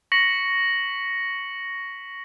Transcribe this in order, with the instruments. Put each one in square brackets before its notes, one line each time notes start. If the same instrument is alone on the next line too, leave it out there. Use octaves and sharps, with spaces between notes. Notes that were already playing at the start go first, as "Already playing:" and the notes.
[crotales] C#6 A#6 B6 C#7 F#7